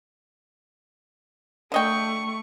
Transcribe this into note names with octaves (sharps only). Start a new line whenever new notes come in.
D3 A3 D#5 G5 C#6